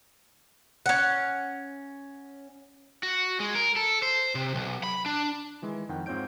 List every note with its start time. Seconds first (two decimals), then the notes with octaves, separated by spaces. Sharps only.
0.86 C#4 F#5
3.03 F#4
3.40 G#3
3.55 A#4
3.76 A4
4.02 C5
4.35 C3
4.55 B1
4.84 B5
5.06 D4
5.62 D#3 E3 G#3
5.89 F2 D#3 F#5 G5
6.06 G#2 C4 F4 C#5 G6 D7